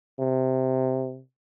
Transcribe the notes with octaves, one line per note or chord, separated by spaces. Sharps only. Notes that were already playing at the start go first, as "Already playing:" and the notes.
C3